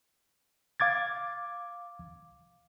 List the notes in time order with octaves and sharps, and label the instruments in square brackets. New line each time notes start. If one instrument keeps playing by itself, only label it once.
[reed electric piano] F5 D6 G#6 A6